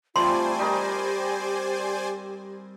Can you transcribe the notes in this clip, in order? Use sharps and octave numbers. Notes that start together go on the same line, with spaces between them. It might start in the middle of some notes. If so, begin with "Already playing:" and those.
G3 A3 C4 F4 C5 D5 G#5 C6
G3 D#4 G4 A#4